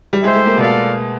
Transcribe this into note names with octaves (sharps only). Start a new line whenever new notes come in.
G3
G#3 E4 G4 C5 E5
A3
A#3
B2 B3 F4 A4 D5 F5